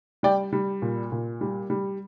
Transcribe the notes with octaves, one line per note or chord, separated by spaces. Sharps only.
G3 D5 G5
G3
A#2
A#2
G3
G3